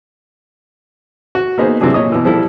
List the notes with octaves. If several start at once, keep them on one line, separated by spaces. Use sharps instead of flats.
F#4
A#3 B3 D#4 G#4 C5
C3 E3 F#3 D4 G#4
A#2 C#5 D#5 D#6
B2 E3
F3 G3 E4 A4